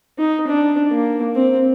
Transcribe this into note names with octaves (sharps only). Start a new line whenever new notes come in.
D#4
D4
A#3
C4